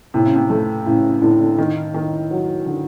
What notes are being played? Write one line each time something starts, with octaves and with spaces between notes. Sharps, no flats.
A2 C3
C#3
C3
A3
A2 C#3
C#3
A2 D3
D3
D#3 D#4
D#3 D#4
F#3
D3